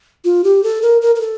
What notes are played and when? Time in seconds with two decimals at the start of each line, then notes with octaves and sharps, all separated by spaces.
0.25 F4
0.44 G4
0.63 A4
0.82 A#4
1.02 A#4
1.15 A#4
1.21 A4